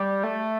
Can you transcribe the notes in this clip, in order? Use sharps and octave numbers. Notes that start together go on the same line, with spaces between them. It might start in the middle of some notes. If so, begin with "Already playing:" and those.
Already playing: G3
A3